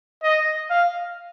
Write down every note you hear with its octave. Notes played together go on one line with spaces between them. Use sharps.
D#5
F5